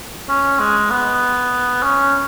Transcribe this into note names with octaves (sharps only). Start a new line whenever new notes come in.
C#4
G#3
B3
C#4